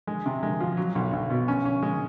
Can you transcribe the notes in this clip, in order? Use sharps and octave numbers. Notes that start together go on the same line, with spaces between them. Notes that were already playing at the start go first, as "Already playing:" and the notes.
G#3
C3
G#3
F3
F#3
B1
B1
B2
C#4
C#4
G#3